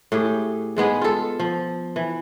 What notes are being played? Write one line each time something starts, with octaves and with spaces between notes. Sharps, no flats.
A2 G4 G#4
G#2 G#3 B3 G#4
F4 A4
F3
E3